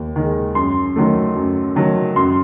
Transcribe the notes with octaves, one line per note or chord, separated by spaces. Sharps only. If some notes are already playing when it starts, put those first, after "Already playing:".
Already playing: D#2
D#3 G#3
F#2 C6
D#3 F#3 A3
F#2
D#3 F#3 A3
F#2 C6